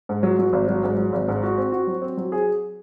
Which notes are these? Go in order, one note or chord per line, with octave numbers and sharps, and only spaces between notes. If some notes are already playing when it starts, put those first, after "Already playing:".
G#2
F#3
F#3
G#1
F#3
G#2
F#3
G#1
G#2
F#4
C4
F#4
F#3
C4
F#3
G#4